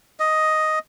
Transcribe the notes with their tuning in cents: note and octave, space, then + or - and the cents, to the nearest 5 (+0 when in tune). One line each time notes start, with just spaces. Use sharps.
D#5 +5